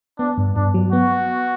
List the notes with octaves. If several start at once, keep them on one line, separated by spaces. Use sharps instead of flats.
B3 D4
G2
G2 D4
F#3
B3 F#4